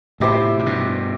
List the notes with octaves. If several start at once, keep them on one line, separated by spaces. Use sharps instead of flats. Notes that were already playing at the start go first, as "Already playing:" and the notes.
A2 C3 E4 G4 C5 E5
A2
G2 B2